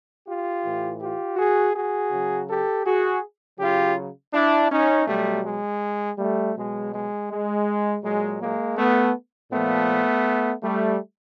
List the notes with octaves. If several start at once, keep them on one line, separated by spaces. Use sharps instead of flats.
F4 G4
A2 E3
F4 G4
F#4 G#4
F#4 G#4
C#3 F#3
G4 A4
F#4 G#4
C#3 F#3 F4 G4
D4 E4
C#4 D#4
B2 F#3 G3 A3
G#3
G3 A3
B2 F#3 G#3
G#3
G#3
A#2 F#3 G#3
G#3 A#3
A3 B3
A#2 F3 A3 B3
G3 A3